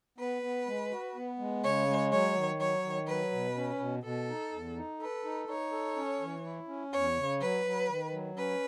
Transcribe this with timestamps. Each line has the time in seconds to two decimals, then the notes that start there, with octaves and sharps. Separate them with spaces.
0.18 B3 B4
0.42 B3
0.67 G#3
0.91 F#4
1.15 B3
1.39 G#3
1.63 C#3 C#5
1.87 G#3
2.11 F#3 C#5
2.35 D#3
2.59 F#3 C#5
2.83 D#3
3.07 F#3 B4
3.32 B2
3.56 C#4
3.79 B2
4.03 B2 A4
4.28 D#4
4.52 E2
4.77 D#4
5.00 A4 B4
5.24 D#4
5.48 D#4 C#5
5.72 A4
5.96 C#4
6.21 E3
6.45 E4
6.68 C#4
6.93 E2 C#5
7.16 C#3
7.41 F#3 B4
7.65 F#3
7.89 D#3
8.13 F#3
8.37 C#4 B4